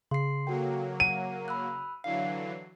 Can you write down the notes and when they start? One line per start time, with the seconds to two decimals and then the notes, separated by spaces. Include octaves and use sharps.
0.11 C#3 C6 C7
0.47 F#3 A#3 F#4 A4 G5
1.00 F#5 D#7
1.48 B5 E6 F#6
2.04 D3 E3 F#3 F5 C7